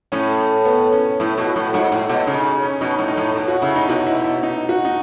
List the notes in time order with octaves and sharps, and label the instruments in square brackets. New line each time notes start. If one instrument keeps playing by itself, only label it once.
[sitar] A2 [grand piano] C#4
[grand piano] B3
C#4
[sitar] A2 [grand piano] E4
[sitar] B2
[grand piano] F#4
[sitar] A2
[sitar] G#2 [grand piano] F#4
[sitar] A2
[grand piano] E4
[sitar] B2
[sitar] C#3 [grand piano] D#4
[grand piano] C#4
[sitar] B2 [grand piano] D#4
[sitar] A2
[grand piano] D#4
[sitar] A2
B2
[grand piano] F#4
[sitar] C#3 [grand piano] E4
[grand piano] D#4
[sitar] B2 [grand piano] F#4
[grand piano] E4
E4
D#4
F#4
D#4